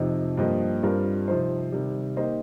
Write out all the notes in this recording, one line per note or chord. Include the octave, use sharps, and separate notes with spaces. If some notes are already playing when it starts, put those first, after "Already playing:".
Already playing: F2 C3 F3 D#4
G2 F3 A#3 G4 D#5
G2 G3 C4 F4 A#4
C3 F3 C4 D#4 C5
C3 D#3 G3
A#3 D#4 G4 C5 D#5